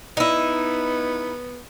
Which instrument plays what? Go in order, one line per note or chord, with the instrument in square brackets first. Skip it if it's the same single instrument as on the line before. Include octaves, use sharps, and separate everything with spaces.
[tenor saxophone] B3 [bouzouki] D#4 E4